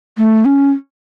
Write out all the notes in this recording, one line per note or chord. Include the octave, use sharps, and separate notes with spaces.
A3
C#4